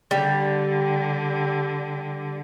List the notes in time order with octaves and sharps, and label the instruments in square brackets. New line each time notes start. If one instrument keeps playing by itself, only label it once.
[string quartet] D3 [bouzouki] G3